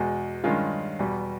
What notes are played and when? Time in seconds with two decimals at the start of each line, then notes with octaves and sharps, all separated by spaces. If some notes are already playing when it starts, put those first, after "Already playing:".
Already playing: E2 B2 G#3
0.44 G2 D#3 G#3 C#4 F4
0.99 E2 B2 G3